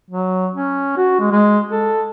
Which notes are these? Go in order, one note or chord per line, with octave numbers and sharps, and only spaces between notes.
F#3
C#4
F#4
G#3
G#3
A4